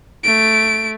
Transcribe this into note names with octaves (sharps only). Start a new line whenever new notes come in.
A3 D7